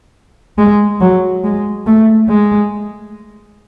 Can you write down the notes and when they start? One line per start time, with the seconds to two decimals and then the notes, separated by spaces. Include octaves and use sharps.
0.58 G#3
1.01 F#3
1.44 G#3
1.87 A3
2.30 G#3